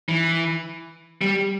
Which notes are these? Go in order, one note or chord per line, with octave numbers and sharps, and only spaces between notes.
E3
G3